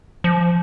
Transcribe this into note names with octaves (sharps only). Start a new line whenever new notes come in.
F3